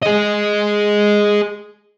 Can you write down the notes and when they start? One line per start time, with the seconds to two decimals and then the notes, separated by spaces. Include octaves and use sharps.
0.02 G#4 D#5